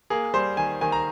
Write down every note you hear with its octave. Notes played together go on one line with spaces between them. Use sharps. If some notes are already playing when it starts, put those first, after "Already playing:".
A#3 G#4
G3 C5
D#3 G#5
D#3 G#5
A#5